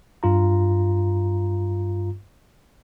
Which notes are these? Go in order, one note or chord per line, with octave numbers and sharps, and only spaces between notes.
G2 F4 A#5